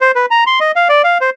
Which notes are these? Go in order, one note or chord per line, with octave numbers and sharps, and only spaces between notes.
C5
B4
A#5
C6
D#5
F5
D5
F5
C5